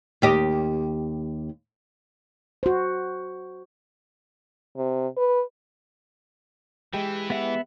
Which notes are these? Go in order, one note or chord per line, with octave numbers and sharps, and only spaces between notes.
D#2 G4 D#5
F#4 C5
C3
B4
E3 G#3 G4 G5
B3 E5 F#5